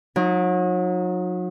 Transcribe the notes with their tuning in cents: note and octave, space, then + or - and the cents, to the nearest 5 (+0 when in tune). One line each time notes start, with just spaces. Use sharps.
F#3 -35 D#4 +0